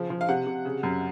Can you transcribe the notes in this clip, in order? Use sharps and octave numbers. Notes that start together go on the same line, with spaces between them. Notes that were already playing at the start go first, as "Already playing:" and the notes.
Already playing: C#3 F3
F3
F5
C3 F#5
C3
C#3
F#2